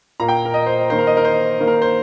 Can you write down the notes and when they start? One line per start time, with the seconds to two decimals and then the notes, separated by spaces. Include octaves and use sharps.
0.20 A#2 A#3 A#5
0.28 G5
0.45 A#4
0.54 D#5
0.66 C5
0.90 D#3 A#3 C5
0.99 A#4
1.07 D#5
1.17 A#4
1.25 C5
1.60 D#3 A#3
1.67 A#4
1.82 C5